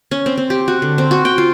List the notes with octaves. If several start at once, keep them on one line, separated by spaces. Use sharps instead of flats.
C#4
C4
C4
G4
F#4
D3
C4
F#4
G5
F4